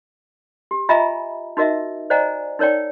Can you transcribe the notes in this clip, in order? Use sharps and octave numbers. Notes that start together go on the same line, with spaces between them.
G4
F4 D#5 E5 G#5 A#5 B5
D#4 F#4 A#4 D#5 E5
C5 D5 D#5 F#5 G#5 A#5
D#4 A#4 C#5 D5 G5